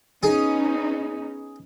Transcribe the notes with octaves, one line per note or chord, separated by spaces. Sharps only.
B3 C#4 D#4 G#4